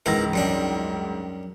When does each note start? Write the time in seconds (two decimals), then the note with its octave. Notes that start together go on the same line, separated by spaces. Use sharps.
0.06 C#2 G#2 E3 E4 A#4 A#6
0.34 F#2 G3 D4